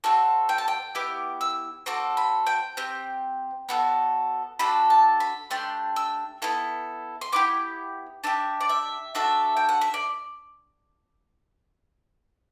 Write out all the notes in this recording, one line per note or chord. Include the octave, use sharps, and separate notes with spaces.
C4 F#4 A4
G5
A5
G5
B3 E4 G4 D6
E6
C4 F#4 A4 D6
B5
G5
C4 G4
B3 F#4 A4
D4 F#4 A4 B5
A5
B5
A3 D4 G4 C6
E6
B3 E4 A4
C6
B3 E4 G4 D6
D4 G4 E5
D5
E5
D4 F#4 A4 E5
G5
F#5
E5
D5